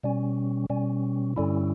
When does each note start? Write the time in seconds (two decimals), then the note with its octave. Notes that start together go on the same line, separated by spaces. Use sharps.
0.03 B2 G3 C#4
0.70 B2 G3 C#4
1.36 G2 D3 G3 C#4 E4